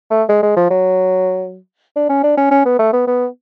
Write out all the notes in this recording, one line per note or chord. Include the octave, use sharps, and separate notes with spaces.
A3
G#3
G#3
F3
F#3
D4
C#4
D4
C#4
C#4
B3
A3
B3
B3